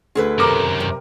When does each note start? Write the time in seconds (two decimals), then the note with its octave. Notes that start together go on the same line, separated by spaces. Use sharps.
0.15 D2 G#4 A4 B4
0.38 F#2 C3 D#3 A#4 D6
0.80 G2